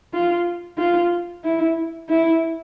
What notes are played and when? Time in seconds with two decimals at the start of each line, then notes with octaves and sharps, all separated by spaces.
0.14 F4
0.78 F4
1.44 E4
2.09 E4